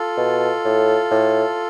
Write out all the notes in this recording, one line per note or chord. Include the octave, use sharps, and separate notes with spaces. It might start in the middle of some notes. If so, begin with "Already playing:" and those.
Already playing: F4 A4
B2
A2
A2